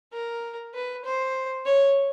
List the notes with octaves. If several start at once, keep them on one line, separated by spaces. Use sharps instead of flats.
A#4
B4
C5
C#5